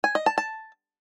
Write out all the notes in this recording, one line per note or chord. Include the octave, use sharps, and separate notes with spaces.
G#5
D#5
A5
A5